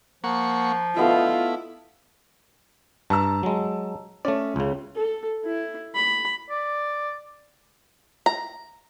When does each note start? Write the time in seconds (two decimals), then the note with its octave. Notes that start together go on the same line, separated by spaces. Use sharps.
0.24 F3 A#3 F#5 C#6
0.97 A3 B3 E4 F4 D#5
3.10 G2 A5 A#5 E6
3.43 F#3 G#3
4.25 A3 C#4 D5
4.56 C#2 C#3
4.95 A4
5.45 E4
5.95 B5
6.50 D5
8.26 A#5